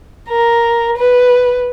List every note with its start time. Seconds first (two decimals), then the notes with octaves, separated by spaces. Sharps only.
0.29 A#4
0.96 B4